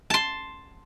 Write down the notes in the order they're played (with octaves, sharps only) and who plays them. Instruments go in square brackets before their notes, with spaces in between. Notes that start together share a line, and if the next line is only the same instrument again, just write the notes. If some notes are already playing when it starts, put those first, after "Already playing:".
[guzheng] A5 C6